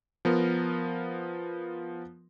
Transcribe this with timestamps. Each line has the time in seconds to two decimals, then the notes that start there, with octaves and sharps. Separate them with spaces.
0.25 F3 B3 A#4